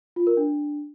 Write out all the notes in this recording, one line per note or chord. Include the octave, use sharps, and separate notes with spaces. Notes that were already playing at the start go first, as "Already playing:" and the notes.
F4
A#4
D4